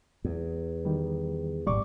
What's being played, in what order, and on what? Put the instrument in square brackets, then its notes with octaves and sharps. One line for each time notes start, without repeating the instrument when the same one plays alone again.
[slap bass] E2
[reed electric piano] D#3 G3
[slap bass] G#1 C#2 G3 [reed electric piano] D5 C#6 D6